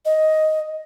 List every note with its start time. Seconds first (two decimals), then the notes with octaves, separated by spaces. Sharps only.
0.05 D#5